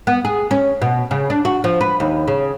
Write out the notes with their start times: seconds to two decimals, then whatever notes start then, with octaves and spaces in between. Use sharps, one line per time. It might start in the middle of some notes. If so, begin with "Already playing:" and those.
0.07 B3
0.25 G#4
0.51 C#4
0.82 B2
1.11 C#3
1.30 D4
1.45 F#4
1.64 F3
1.81 B4
2.00 D#2
2.28 C#3